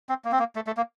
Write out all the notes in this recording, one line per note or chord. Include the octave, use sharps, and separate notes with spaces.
C4
A#3
C4
A#3
A3
A3
A#3